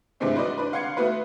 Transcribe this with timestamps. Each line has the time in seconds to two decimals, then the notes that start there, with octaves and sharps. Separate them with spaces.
0.20 G2 C3 E3 G#3 A3 C4
0.36 F#4 B4 C5 D5 D#5
0.58 D4 B4
0.73 F5 F#5 C6 G#6 C7 C#7
0.97 A3 B3 F#4 B4